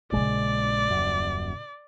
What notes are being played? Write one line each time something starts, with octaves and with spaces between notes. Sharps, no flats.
A#1 A#2 C#3 G#3 D5
D#1 F#2